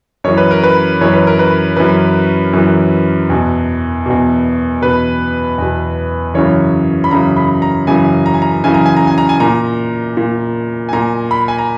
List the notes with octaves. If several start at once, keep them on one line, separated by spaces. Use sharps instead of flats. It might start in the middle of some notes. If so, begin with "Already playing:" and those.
F#2 E3 C#5
B4
A#4
B4
F#2 E3 C#5
B4
A#4
B4
F#2 E3 B4
F#2 E3
E2 B2
E2 B2
E2 B2 B4
E2 B2
F#2 C#3 E3 C#5
B5
F#2 C#3 E3 A#5
B5
A#5
F#2 C#3 E3 G#5
A#5
G#5
A#5
F#2 C#3 E3 G#5
A#5
G#5
A#5
G#5
A#5
G#5
A#2 A#5
A#2
G#5
A#2 A#5
B5
G#5
A#5